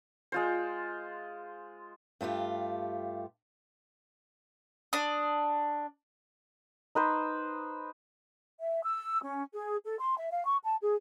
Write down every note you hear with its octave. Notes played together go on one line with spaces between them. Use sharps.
G#3 F4 C5
G2 A3 F4 G4
D4 D#6
D#4 B4 C5
E5
E6
C#4
G#4
A4
C6
E5
F5
C#6
A5
G#4